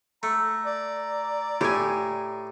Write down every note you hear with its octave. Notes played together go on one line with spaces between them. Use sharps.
A3 A#5
D5
A2 G4 G#5